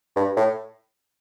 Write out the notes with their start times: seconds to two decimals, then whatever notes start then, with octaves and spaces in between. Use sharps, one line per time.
0.16 G2
0.37 A2